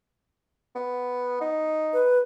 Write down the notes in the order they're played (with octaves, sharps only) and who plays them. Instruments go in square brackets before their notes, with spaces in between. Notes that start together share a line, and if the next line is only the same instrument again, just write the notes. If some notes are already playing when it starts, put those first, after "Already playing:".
[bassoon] B3
D#4
[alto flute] B4